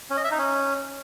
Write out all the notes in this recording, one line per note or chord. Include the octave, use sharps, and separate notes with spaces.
C#4
D#5
E5
D#4
C#4